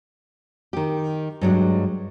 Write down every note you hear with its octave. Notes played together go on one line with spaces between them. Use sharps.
D#3 G4
G2 F#3 G#3 D4